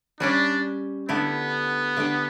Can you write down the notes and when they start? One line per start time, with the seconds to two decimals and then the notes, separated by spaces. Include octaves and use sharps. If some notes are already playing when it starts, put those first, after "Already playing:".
0.20 G3 C#4 D4 G4
1.09 D3 A3 B3 E4 G4
1.97 D3 A3 D4 G4